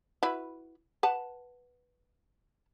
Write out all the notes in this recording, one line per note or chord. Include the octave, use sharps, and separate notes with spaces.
E4 F#4 B4
B4 F#5 A5